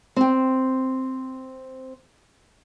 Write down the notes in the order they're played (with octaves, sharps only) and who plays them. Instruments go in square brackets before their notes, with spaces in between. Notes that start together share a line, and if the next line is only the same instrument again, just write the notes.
[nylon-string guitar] C4 G5